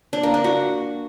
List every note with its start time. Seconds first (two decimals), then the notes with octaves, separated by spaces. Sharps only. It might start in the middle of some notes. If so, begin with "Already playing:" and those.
0.13 D4
0.23 A#3
0.34 D4
0.44 F#4